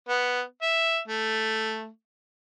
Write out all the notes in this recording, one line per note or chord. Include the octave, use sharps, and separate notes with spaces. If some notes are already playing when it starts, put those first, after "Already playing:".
B3
E5
A3